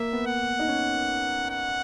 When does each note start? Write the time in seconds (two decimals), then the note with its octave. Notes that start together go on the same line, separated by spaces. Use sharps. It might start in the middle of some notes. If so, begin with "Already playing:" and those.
Already playing: A#3 E5
0.13 B3
0.27 F#5
0.59 D#4
0.68 C#4
1.50 F#5